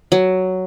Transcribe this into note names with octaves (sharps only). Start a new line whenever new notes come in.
F#3